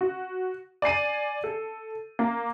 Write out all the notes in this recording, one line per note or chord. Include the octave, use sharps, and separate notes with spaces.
F#4
D5 G#5 C7 D#7
A4
A#3